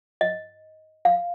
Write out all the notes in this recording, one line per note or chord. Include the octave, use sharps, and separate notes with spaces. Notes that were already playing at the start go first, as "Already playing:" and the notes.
D#5
F5